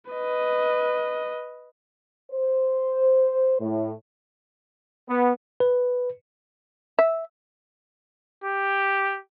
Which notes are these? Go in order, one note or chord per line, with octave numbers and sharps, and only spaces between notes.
B4 D#5
C5
A2
B3
B4
E5
G4